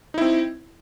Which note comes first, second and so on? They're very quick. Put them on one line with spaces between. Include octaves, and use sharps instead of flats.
D#4 E4 C4